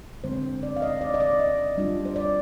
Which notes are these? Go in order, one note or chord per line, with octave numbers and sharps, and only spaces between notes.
D3 G#3 C4 C5
D5
F5
D#5
D5
D#5
D5
D#5
G3 D4 F4
C5
D5